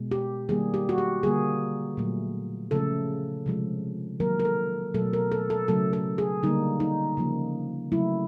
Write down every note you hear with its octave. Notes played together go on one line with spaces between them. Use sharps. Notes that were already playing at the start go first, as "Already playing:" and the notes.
Already playing: B2 G#3
G4
D#3 G3 A#3 G#4
G4
F#4
G4
D3 G3 A#3 G#4
A#2 F#3 A3
C#3 F3 A3 A4
C3 F3 G#3
D#3 F#3 A#3 A#4
A#4
A4
B2 F#3 A3 A4
A#4
A4
A4
C#3 F#3 A3 A4
A4
G#4
D3 G3 A#3 D#4
D#4
C#3 F3 A#3
C#3 F#3 A3 E4